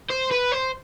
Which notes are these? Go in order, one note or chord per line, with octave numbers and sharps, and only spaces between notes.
C5
B4
C5